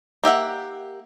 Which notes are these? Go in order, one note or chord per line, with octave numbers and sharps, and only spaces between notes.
A#3 G4 E5 F#5